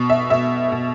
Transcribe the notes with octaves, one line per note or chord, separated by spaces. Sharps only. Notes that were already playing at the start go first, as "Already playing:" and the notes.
Already playing: B2
E5
B2 E5
B2